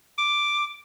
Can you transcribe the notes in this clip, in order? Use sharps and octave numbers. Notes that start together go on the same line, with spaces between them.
D6